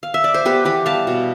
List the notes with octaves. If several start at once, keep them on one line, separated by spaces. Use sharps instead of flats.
F5
E5
D5
C5
B3 G4 B4
E3 G4 B4
G3 F5 A5
B2